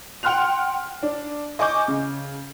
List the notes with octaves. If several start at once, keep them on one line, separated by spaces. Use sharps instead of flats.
F#5 G5 C6 F6 F#6 F7
D4
D#5 G#5 C#6 D6 G6
C#3